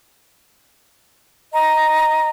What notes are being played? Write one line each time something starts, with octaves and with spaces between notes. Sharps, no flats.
D#5 A#5